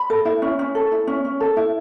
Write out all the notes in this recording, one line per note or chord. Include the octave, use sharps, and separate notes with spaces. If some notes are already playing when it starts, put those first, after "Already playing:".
Already playing: B5
A4
E4
C#4
C#4
A4
E4
C#4
C#4
A4
E4